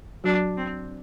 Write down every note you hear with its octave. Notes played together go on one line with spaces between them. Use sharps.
F#3 D4 F#4
C4